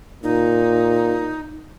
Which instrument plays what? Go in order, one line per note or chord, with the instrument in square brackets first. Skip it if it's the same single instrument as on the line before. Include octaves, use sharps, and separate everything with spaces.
[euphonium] A#2 [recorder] D#4